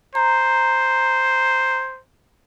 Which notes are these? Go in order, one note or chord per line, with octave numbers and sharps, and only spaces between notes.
C5 A#5